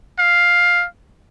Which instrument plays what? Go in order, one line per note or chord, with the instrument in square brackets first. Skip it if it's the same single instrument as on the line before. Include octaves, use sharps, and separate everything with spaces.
[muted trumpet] F5